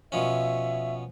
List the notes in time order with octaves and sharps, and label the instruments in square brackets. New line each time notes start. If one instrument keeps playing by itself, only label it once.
[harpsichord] B2 F3 C#4 [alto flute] E5